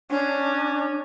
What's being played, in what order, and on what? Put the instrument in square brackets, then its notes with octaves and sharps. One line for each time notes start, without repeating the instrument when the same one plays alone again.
[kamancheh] C#4 [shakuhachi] D4